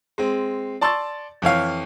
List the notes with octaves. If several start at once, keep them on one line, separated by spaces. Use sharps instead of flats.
G#3 C4
D5 A5 C6 C#6 E6 A6
F2 E3 C#5 F5